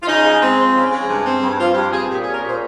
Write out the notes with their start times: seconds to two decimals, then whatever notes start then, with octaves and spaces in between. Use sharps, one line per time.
0.03 F4
0.07 C#3 D#4
0.24 G#3
0.41 C4
0.58 F3
0.74 C#3
0.91 G#3
1.09 G2
1.25 C4
1.42 G2
1.58 F3 F4
1.74 G2 G4
1.92 C4 G#4
2.08 A#2 G4
2.21 C#4 G#4
2.34 A#4
2.41 A#2
2.47 C5